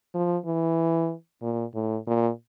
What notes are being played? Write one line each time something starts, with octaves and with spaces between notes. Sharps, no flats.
F3
E3
A#2
A2
A#2